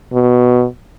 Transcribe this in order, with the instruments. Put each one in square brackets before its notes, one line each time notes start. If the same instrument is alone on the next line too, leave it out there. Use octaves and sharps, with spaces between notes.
[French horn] B2